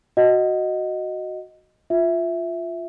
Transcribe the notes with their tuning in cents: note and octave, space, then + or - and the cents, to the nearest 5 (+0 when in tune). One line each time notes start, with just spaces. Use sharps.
F#4 +0 D#5 +0 F#5 +0
F4 +0 E5 +0